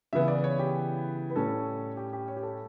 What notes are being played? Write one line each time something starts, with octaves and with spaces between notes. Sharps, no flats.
C#3 E3 B3 E5
D5
C#5
G4
B4
A2 G3 C#4 A4
G4
G4
C#5
G4
A4